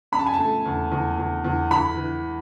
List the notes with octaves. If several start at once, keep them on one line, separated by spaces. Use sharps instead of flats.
C#4 B5
A5
G#5
A5
A3
E2
E2
E2
E2
E3 B5
E3